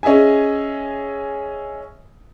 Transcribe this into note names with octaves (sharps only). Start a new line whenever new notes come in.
C#4 G#4 D#5 E5 G#5